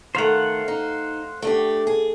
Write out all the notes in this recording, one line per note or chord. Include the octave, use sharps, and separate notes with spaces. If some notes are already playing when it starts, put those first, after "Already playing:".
D#3 A3 C5 F5 F#5
D#4
A3 D4 G4
G#4